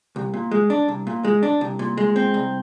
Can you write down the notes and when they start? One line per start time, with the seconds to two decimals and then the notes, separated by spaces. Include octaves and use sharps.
0.16 C2
0.34 A#2
0.51 G#3
0.70 D4
0.88 C2
1.07 A#2
1.25 G#3
1.43 D4
1.61 C2
1.79 A#2
1.97 G#3
2.16 C4
2.34 C2